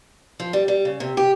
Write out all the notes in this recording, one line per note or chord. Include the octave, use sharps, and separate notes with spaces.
F3
G3
G3
C#3
C3
G4